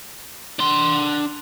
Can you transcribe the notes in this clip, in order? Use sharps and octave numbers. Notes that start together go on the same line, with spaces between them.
D4 C6